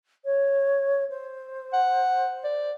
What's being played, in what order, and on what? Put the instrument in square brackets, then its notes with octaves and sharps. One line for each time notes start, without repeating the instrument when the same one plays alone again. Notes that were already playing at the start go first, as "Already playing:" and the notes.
[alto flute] C#5
C5
[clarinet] F#5
D5